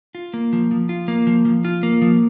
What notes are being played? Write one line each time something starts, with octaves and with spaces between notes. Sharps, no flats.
F4
A#3
F3
F3
F4
A#3
F3
F3
F4
A#3
F3